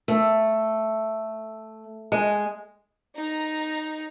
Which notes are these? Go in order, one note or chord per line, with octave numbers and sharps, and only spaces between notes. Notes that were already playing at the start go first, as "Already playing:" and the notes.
A3
G#3
D#4 A#5